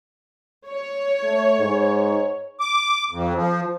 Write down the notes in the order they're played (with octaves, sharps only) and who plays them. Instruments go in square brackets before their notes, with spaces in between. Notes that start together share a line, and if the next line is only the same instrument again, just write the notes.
[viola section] C#5
[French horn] A3
G#2
[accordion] D6
F2
F3